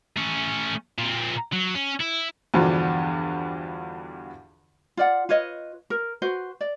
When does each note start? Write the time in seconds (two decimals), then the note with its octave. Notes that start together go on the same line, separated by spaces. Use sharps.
0.17 A3 C#4
0.99 A#2 C4
1.53 F#3
1.75 C#4
2.01 E4
2.54 E2 G2 B2 D3 F3
4.97 F4 D5 F#5
5.29 F4 B4 C#5 D#5
5.90 A#4
6.22 F#4 B4 C5
6.61 D5